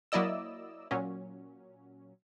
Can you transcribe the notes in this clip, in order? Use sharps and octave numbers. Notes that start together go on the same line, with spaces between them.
F#3 A#3 E4 D5 D#5 E6
A#2 F#3 C#4